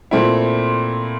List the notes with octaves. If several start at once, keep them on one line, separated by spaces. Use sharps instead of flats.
A#2 A3 C4 E4